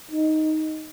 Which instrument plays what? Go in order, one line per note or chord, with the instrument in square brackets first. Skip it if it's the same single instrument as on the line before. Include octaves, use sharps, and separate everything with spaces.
[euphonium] D#4